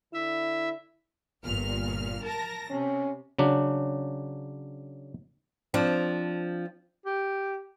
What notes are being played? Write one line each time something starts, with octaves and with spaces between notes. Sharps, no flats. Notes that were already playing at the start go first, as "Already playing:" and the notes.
D3 E4 E5
G1 A#2 F6
A#4 A5 A#6
C3 C#4
C#3 F#3 D4
F3 C4 D4
G4